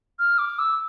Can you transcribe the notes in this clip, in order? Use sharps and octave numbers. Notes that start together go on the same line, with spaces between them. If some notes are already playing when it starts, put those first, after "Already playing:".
F6
D6
E6